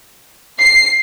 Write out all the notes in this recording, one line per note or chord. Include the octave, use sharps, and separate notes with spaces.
C7